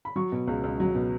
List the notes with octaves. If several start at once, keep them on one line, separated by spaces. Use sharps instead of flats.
B5
F#3 C#6
B2
C#2
C#2
F#3
B2